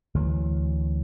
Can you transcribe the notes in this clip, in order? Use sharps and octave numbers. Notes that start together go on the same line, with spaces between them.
D2 E3 F#3